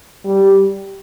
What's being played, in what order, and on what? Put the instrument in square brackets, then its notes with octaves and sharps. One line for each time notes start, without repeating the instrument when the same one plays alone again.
[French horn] G3